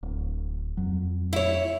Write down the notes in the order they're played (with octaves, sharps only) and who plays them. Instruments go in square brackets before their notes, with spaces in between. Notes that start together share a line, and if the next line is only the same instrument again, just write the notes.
[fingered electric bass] D1
F2 F#3
[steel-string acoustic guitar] E4 C#5